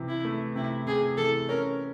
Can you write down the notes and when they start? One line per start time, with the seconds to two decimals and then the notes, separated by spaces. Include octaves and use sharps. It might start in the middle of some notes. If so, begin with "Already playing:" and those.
Already playing: C3 E3
0.09 E4
0.25 A3
0.55 C3 E4
0.87 C3 G#4
1.17 E3 A4
1.49 C#4 A#4